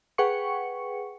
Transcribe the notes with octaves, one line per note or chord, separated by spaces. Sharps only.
G#4 B4 F#5 G5 C#6 C#7